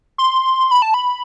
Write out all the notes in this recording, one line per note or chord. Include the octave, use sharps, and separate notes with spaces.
C6
B5
A5
B5